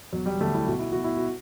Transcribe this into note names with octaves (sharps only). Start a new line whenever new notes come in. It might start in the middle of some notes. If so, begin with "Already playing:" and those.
E1 F#3
G3
D2 D3 A3
E4
B1 F#4
E4
B2 F#4
E4
F#4